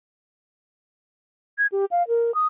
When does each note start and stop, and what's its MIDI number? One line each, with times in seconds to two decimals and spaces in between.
1.58 1.67 92
1.72 1.85 67
1.91 2.06 77
2.08 2.34 70
2.34 2.47 87